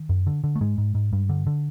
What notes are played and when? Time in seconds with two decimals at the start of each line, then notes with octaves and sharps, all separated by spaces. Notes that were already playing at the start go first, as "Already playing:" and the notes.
Already playing: D#3
0.09 F#2
0.27 D3
0.44 D3
0.55 A3
0.61 G#2 G#3
0.78 G#2
0.95 G#2
1.13 G2
1.29 D3
1.47 D3